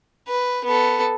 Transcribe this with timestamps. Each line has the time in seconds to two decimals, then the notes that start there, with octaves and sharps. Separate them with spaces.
0.28 B4
0.65 B3 A4